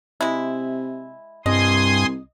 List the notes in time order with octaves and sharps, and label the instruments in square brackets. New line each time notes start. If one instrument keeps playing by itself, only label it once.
[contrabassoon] C3 [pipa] G#3 E4
[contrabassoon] C2 [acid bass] G2 [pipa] D#5 [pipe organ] G#5 C6 D#6